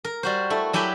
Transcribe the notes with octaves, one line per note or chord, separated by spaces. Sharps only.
A#4
G3 F#4 C5
A3 E4
F#3 E4 G4 G5 G#5 B5